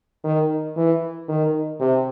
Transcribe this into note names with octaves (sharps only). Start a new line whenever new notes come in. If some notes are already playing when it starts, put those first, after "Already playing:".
D#3
E3
D#3
C3